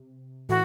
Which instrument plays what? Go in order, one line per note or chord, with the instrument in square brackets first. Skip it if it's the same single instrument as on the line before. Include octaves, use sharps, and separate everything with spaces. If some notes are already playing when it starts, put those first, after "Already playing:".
Already playing: [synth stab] C3
[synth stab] A2 E3 [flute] F#4